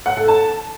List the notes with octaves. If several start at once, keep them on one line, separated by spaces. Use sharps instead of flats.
F#5
A4
A5